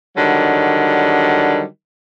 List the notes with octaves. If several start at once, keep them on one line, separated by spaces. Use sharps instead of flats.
D3 D#3 F#3 G3